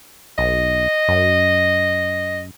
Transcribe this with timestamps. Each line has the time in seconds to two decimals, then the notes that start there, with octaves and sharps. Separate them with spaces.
0.38 B1 D#5
1.08 F#2